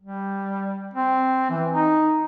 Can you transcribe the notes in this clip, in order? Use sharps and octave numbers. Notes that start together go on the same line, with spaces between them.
G3
C4
E3
D#4